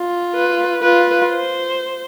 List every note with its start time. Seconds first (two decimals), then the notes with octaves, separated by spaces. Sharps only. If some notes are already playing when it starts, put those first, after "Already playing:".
Already playing: F4
0.35 B4
0.83 F4 B4
1.31 C5